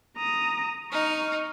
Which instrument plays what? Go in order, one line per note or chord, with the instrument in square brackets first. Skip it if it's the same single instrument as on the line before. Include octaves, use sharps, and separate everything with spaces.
[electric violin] A#5 D#6
[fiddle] D#4 [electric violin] C#6 F6